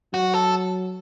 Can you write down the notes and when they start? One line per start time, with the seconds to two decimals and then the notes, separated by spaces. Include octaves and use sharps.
0.14 F#3 F#4
0.34 A4